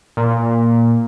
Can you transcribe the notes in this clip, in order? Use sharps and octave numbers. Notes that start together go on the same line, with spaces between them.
A#2